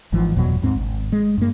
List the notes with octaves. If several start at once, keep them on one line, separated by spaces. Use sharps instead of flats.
G#1 G#2 E3 F3
F#1 E2 B2 F#3
D#2 G#2 C4
G#1
G#3
G2 A#3